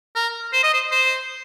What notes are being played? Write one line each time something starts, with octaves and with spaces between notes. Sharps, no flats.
A#4
C5
D#5
C5
C5